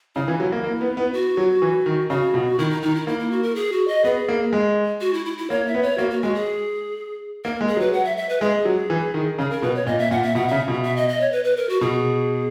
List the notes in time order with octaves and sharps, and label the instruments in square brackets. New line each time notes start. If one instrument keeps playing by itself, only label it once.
[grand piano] C#3 [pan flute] E4
[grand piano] E3
F#3
A#3
A#3
B3
B3
[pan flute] F#4
[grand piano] F#3
E3
D#3
[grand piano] C#3 [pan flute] F#4
[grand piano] B2
[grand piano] D#3 [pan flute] E4
[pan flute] D#4
[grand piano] D#3 [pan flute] D#4
[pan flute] E4
[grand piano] A#3 [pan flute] E4
[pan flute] E4
F#4
A#4
G#4
F#4
D#5
[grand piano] B3 [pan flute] G#4
[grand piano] A#3
G#3
[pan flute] F#4
E4
E4
E4
[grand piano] A#3 [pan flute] C#5
[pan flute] E5
[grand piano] B3
[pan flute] C#5
[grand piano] A#3 [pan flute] F#4
[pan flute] F#4
[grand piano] G#3 [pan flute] F#4
[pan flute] G#4
[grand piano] A#3 [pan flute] A#4
[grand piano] G#3
[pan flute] G#4
[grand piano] F#3 [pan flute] B4
[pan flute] F#5
E5
E5
B4
[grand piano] G#3 [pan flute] G#4
[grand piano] F#3
E3
D#3
[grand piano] C#3 [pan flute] G#4
[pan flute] A#4
[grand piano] B2 [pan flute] B4
[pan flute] C#5
[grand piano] A#2 [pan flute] D#5
[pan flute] E5
[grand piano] A#2 [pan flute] F#5
[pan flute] E5
[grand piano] B2 [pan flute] F#5
[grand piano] C#3 [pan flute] E5
[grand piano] B2
[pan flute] E5
D#5
D#5
C#5
B4
B4
A#4
F#4
[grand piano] B2 [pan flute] G#4